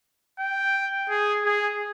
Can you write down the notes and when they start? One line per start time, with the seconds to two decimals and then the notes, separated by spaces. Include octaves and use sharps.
0.39 G5
1.09 G#4
1.44 G#4